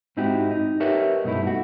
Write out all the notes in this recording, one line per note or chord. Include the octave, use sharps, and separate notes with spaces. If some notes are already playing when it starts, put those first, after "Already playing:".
G#2 C4 D#4 E4 F#4 G4
D#4
G4 A#4 B4 C#5 D#5 E5
G2 B2 A3 D#4 E4
F#4